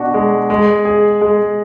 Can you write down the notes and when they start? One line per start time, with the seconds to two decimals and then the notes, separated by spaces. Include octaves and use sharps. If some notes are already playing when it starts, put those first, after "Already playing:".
Already playing: B2 D4 F#4
0.14 G#3
0.50 G#3
0.85 G#4
1.21 G#3